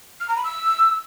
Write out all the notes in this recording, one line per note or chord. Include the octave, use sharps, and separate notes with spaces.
F6
A#5
B5
E6